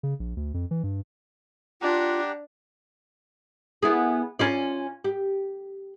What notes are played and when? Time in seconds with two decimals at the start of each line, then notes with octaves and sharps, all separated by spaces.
0.03 C#3
0.20 A#1
0.37 D2
0.54 F2
0.71 E3
0.84 G2
1.82 D4 F4 G4 F#5 A#5
3.82 B3 E4 G#4
4.39 C#4 F4 D5
5.04 G4